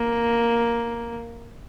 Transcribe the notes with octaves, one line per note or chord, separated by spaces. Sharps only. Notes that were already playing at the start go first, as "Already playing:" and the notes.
Already playing: A#3